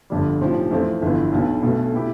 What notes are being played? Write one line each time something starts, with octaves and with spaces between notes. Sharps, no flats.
G1 F2 D3 G3
B1 A2 F3 C4 G4
F2 E3 A3 C4 F4
G1 F2 E3 B3 F4
B1 B2 B3
B1 B2 A3
B2 B3 E4 G4